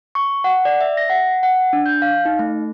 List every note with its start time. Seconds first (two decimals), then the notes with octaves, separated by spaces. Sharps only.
0.15 C#6
0.44 F#5
0.65 D5
0.81 E5
0.97 A#6
1.10 F#5
1.43 F#5
1.73 D4
1.86 G6
2.02 F5
2.25 D#4
2.39 A3